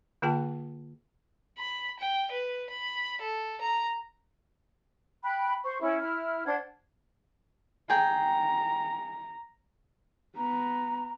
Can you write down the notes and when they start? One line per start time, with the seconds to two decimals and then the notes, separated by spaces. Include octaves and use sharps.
0.22 D3 A#3 F4 G#4 G5 A5
1.58 B5
1.99 G5
2.32 B4
2.70 B5
3.21 A4
3.61 A#5
5.24 G5 B5 F#6
5.64 C5 C#6
5.80 C#4 E4
6.00 E4 F6
6.45 D4 C5 F#5 G#6
7.90 G#4 G5 A#5
10.37 B3 A#5